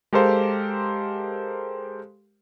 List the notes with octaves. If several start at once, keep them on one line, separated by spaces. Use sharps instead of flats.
G#3 G4 A4 A#4 C5 F5